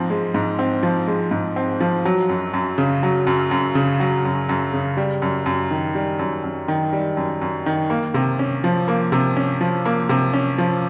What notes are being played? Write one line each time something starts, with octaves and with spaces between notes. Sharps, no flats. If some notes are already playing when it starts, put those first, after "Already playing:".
Already playing: G#2 F3 C4
G#3
G#2
C4
F3
G#3
G#2
C4
F3
F#3
F#2
F#2
C#3
F#3
F#2
F#2
C#3
F#3
F#2
F#2
C#3
G3
F#2
F#2
D#3
G3
F#2
F#2
D#3
G3
F#2
F#2
D#3
A#3
C3
C#4
F3
A#3
C3
C#4
F3
A#3
C3
C#4
F3